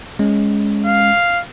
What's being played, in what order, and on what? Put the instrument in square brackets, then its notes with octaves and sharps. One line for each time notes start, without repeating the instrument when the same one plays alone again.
[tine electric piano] G#3 C#4
[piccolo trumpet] F5